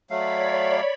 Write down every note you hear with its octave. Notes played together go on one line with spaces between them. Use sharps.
F#3 A3 C#5 D5 F5 B5